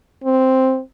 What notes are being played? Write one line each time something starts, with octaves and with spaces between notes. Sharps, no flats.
C4